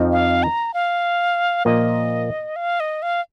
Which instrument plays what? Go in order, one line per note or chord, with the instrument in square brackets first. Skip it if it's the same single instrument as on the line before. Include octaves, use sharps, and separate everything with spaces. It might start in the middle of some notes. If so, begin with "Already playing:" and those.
Already playing: [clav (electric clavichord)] F2 F3 C4 D#4
[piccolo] F5
A#5
F5
[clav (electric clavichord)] A#2 F3 A#3 [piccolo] D#5
[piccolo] F5
D#5
F5